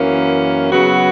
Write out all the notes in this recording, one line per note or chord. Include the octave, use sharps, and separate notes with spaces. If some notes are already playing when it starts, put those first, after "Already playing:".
Already playing: F#2 E3 A#3 C#4
C#3 F#3 B3 F#4